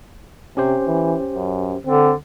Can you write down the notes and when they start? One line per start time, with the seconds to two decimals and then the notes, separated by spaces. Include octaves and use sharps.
0.57 C3 C#4 G4 C5
0.87 E3
1.35 F#2
1.86 D3 C4